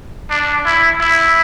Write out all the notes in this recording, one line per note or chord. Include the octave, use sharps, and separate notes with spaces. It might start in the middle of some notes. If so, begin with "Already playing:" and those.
D4
E4
E4